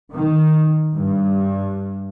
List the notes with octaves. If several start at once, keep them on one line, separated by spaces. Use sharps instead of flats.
D#3
G2